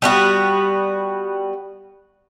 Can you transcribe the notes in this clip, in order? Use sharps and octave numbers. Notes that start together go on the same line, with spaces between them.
G3 B3 F#4